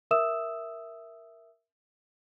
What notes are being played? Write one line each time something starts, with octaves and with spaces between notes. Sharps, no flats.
A#4 E5 D#6 E6 E7